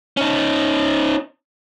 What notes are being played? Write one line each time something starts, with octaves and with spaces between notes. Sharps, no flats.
C#4 D#4